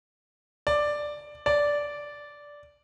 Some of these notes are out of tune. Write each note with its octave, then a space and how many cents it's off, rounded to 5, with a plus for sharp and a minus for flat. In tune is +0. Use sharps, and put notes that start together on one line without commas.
D5 +5
D5 -10